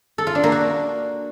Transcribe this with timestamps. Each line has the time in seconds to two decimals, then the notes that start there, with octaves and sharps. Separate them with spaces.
0.18 A4
0.27 F4
0.35 D4
0.43 A#3
0.52 F#4